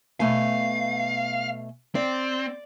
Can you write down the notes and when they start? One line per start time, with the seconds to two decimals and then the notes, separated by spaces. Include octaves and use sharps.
0.20 B2 A3 F5 G#5
1.95 C4 D5